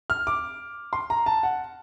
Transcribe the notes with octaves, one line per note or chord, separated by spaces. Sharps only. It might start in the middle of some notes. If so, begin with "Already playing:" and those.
F6
D6
C6
A#5
A5
F#5